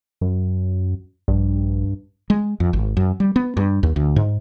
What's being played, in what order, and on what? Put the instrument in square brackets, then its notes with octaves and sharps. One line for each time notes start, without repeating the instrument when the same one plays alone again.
[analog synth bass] F#2
[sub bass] A#1 [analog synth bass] G2
[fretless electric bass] G#3
F2
G#1
F#2
G3
B3
G2
D#2
D2
G#2